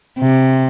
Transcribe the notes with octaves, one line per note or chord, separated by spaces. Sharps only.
C3